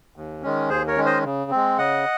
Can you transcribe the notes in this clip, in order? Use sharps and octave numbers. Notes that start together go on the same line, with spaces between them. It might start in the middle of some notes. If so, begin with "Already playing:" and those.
D#2
D#3 G#3 C#4
D#2 G#4 C5
A#4 C#5
D#3 G#3 C#4
C5 D#5
C#3
G#3 C4
C#3 D#5 F#5